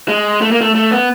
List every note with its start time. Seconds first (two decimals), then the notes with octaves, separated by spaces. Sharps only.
0.08 G#3
0.42 A3
0.51 A#3
0.61 A3
0.75 A3
0.91 B3